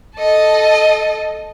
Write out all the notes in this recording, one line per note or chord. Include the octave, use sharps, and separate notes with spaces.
A4 D#5